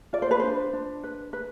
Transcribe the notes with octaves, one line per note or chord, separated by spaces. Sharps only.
F4 D5
C5
B4
D4 C5
D4
B4
B4